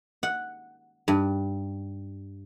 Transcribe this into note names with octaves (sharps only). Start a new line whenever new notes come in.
F#5
G2